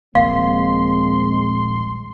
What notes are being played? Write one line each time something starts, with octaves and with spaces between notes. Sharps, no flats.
D#1 A#1 G#3 A#3 C4 F5 C6